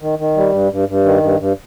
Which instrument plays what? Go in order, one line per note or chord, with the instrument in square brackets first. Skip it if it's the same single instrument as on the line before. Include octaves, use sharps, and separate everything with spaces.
[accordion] D#3
D#3
G3
G2
G2
G2
D#3
G2
G2